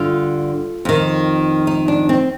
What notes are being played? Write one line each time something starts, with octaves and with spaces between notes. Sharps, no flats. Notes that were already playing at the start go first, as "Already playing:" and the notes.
Already playing: G2 D3 F4
F2 D#3
D#4
D4
C4